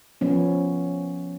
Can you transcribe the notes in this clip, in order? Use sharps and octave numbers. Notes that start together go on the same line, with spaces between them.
F3 B3 C#4